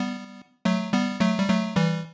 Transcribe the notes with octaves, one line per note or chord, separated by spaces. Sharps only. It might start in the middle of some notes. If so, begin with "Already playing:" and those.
Already playing: G3 B3
F#3 A3
G3 B3
F#3 A3
G3
F#3 A3
E3 G3